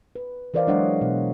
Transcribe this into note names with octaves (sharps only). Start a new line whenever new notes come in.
B4
E3 A#4 C5 D5 D#5 F5
F#3 G#3 D4 C#5 D#5 F#5
B2 D5